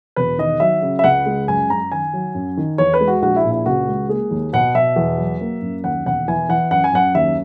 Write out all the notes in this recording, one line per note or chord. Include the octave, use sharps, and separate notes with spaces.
E1 B4
D#3 D#5
F#3 E5
C#3
E5
C#2 F#5
G#3
F#2 G#5
F#2 A#5
D#3 G#5
F#3
F#2
D#3
E2 C#5
B4
G#3
F#4
A#1 F#4
E4
A#2
E4
C#2 F#4
G#3
A#3 G#4
D#2
B2 F#5
B2 E5
E2
F#3
A#3
F#2
D#2 F#5
E1 F#5
E3 G#5
E3 F#5
F#2 F#5
G#5
F#2 F#5
D#2 E5